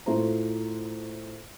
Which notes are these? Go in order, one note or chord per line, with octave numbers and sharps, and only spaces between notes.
A2 A3 F4 C5 A#5